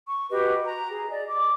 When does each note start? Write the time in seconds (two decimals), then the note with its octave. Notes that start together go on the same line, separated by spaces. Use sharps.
0.08 C#6
0.31 F#4 G4 B4 D#5
0.66 A#5
0.90 G#4
1.10 D5 D#5
1.29 D6